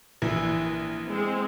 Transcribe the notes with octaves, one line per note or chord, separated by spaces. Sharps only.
A#1 E3
G#3 C4